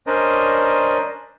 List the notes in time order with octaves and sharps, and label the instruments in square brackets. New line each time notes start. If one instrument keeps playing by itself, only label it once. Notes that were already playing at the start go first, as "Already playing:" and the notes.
[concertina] C#4 D4 A#4 C5 D5 D#5